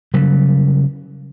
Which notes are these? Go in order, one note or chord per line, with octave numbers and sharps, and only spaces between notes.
C#3 F#3 G3